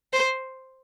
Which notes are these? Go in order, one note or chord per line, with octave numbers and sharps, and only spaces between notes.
C5